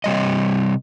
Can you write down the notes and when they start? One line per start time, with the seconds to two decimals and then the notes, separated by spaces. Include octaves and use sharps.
0.04 C3 G3 D#5